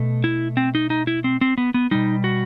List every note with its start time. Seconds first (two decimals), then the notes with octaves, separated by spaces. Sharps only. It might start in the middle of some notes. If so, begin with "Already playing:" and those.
Already playing: B2 A3
0.24 E4
0.57 C4
0.75 D#4
0.90 D#4
1.07 E4
1.24 C4
1.41 C4
1.58 B3
1.74 B3
1.91 B2 G3 D#4
2.24 F#4